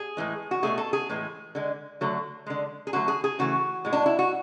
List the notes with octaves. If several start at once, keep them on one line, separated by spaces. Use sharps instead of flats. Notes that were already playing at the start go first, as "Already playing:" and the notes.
Already playing: G#4
A2 E3 G#3
F#4
B2 F#3 A3 G#4
A4
G#4
A2 E3 G#3
D3 G#3
D3 F#3 A3
D3 G#3
G#4
D3 F#3 A3 F#4
G#4
G#4
C#3 E3 A3 F#4
A2 G#3
D4
E4
F#4